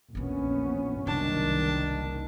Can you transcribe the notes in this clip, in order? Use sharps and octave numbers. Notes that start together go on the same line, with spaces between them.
A#1 E2 B2 B3 C#4
F#1 C2 D#3 D4 A5